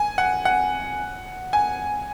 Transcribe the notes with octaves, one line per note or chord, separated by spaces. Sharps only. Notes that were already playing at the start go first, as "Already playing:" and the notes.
Already playing: G#5
F#5
F#5
G#5